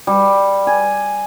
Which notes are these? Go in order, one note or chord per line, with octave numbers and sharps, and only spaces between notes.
G3
G#5